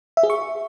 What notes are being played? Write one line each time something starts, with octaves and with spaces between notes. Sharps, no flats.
E5
G#4
C#6